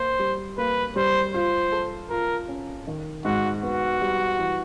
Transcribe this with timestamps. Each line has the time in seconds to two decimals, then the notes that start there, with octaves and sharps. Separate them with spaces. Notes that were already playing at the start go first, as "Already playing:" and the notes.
Already playing: A#3 C5
0.19 G3
0.58 A#3 B4
0.96 G3 C5
1.34 F4 C5
1.72 A4
2.10 F4 A#4
2.48 C#4
2.87 D#3
3.25 G#2 F#4
3.63 B3 F#4
4.01 G3
4.39 E3